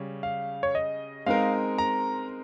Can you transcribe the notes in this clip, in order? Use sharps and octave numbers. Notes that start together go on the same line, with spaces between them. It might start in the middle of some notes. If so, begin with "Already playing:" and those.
Already playing: C#3 G3 C#4
F5
C#5
D#5
G#3 C4 D#4 A#4 F5
A#5